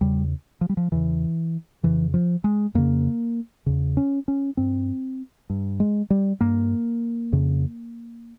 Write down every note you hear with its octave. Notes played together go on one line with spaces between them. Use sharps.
E2 C#3 G3
F3
G3
F3
E2 C#3 E3
F2 C#3 E3
F3
G#3
F2 C#3 A#3
E2 C#3
C#4
C#4
G2 C4
G2
G#3
G3
G2 A#3
F2 C#3